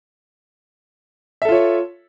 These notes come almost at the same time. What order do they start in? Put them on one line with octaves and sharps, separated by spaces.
E5 A4 F4 C#5